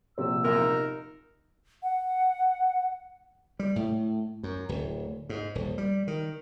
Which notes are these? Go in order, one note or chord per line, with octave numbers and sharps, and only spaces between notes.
A#1 C3 C5 E6
B1 F#2 A#4
D#4
F#5
G3
A2
F#2
D1
G#2
D#1
G3
D#3